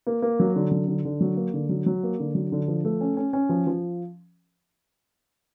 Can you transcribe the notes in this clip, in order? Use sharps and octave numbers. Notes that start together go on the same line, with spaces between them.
A#3
A#3
F#3
D3
F#3
D3
D3
F#3
A#3
D3
F#3
F#3
A#3
D3
F#3
D3
F3
A3
C#4
C#4
C#4
F3
F3